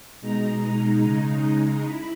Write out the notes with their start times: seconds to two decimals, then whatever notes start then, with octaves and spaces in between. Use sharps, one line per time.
0.21 B2 G#3 D#4 A#5
1.03 C#3 G#3 D#4
1.84 E4 B5